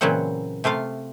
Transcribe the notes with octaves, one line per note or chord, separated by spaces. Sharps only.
A#2 C#3 E3 F#3 C4 F#5
C3 A3 F4 F5